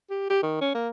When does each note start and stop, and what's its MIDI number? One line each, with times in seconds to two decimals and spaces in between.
0.10 0.26 67
0.30 0.40 67
0.43 0.58 51
0.61 0.71 61
0.74 0.89 58